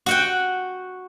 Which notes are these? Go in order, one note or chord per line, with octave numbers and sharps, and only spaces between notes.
F#4 F#5 G5